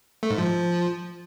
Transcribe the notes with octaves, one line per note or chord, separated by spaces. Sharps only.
A3
G#2
F3